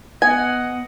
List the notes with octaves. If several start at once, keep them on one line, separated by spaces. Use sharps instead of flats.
B3 D#5 F#5 G#5